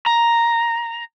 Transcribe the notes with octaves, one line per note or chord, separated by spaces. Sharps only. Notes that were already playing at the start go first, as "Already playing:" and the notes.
A#5